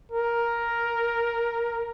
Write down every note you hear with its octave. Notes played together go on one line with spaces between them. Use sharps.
A#4